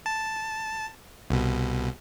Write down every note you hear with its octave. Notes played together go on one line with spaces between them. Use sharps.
A5
C2 B2